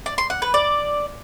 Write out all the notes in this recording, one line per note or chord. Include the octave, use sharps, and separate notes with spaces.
D5
C6
F#5
B4
D5